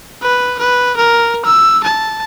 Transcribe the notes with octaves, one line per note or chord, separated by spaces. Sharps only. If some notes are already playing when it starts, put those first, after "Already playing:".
B4
B4
A#4
E6
A5